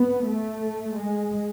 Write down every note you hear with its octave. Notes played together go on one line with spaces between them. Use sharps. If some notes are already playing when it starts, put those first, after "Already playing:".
Already playing: B3
A3
G#3